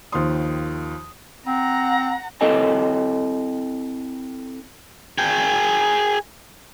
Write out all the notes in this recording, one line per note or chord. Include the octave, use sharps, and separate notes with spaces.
D#2 D#3 F3 C5 C6 D#6
C4 F#5 A#5
C4 E4 A4 D#5 G#5
G#4 G5